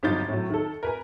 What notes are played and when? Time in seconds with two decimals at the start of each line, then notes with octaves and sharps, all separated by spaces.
0.03 G1 F3 F#3 D#4 G6 A6
0.29 A2 F#3
0.50 D#3 A4
0.83 A#4 B4 G#5